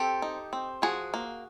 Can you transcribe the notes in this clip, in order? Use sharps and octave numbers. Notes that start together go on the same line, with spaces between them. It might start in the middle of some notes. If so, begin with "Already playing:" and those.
Already playing: C4 G4 A4
D#4
C4
F3 F#4 G#4
A#3